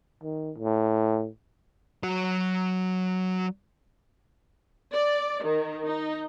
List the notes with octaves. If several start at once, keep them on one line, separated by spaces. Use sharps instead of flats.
D#3
A2
F#3 F#4
D5
D#3
D#4